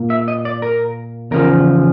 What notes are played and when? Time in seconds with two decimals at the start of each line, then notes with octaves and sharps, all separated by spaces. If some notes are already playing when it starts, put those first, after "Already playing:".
Already playing: A#2 A#3
0.10 E5
0.28 D#5
0.45 D5
0.62 A#4
1.31 E2 C#3 F3 A#4